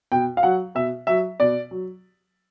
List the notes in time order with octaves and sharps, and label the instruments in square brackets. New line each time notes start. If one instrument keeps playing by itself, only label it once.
[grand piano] B2 G5
F5
F#3 F#5
B2 E5
F#3 E5
B2 D5
F#3